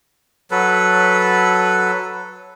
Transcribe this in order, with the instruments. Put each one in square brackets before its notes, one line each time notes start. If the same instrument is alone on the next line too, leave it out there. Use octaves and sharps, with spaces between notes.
[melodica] F#3 A4 B4